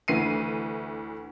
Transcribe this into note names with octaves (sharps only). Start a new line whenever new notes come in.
D2 E3 C7 D#7